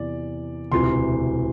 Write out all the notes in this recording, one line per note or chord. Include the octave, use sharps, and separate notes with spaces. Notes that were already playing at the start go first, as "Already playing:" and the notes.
Already playing: E2 C3 E3 D5
E1 D2 C3 E3 C6